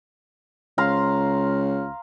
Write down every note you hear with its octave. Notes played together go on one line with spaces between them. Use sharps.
C#2 F5 A#5 C6